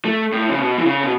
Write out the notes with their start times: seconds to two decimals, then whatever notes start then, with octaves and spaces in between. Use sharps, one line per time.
0.05 A3
0.32 A2
0.49 C#3
0.59 B2
0.78 E3
0.85 C#3
1.03 B2